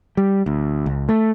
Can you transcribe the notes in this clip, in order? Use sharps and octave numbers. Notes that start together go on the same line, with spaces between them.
G3
D2
C#2
A3